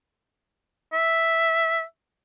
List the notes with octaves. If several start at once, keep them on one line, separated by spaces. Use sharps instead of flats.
E5